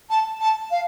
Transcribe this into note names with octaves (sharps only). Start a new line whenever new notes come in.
A5
A5
F5